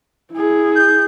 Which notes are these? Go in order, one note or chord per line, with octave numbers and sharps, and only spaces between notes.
E4 G#4
G6